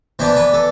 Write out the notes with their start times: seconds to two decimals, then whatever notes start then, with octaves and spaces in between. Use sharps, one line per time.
0.19 E3 B3 D4 C5
0.36 B4
0.53 A4